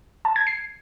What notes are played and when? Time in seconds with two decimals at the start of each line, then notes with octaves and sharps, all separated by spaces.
0.25 A5
0.36 G#6
0.47 C7